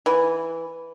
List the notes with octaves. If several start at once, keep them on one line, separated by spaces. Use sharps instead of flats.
E3